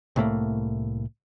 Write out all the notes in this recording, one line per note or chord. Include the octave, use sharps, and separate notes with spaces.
C2 A2 A3 A#3